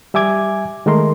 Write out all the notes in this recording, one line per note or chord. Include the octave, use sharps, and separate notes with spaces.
G3 E5 G#5 D6 G#6
D#3 G#3 A3 A#4 C6